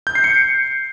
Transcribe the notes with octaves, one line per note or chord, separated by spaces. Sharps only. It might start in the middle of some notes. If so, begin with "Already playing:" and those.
G6
C7
C#7